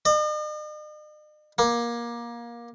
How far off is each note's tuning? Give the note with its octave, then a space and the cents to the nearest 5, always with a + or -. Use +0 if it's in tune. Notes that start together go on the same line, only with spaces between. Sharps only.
D#5 -45
A#3 +20